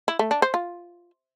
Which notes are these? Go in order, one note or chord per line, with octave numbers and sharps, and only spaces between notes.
E4
A3
D4
C5
F4